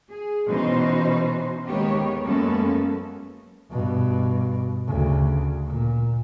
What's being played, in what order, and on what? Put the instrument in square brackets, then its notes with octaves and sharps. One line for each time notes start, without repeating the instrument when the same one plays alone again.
[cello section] G#4
B2 E3 B3 C#4 D#4 C5
D#2 D#3 G#3 B3 G4 C#5
F#2 G#3 A#3 B3 C#4 A4
[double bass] G2 B2
D2 C#3
A#2